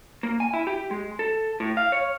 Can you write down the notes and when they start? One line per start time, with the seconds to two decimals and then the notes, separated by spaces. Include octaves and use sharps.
0.23 A#3
0.40 G#5
0.54 E4
0.67 G4
0.91 G#3
1.19 A4
1.60 A2
1.77 F5
1.92 C#5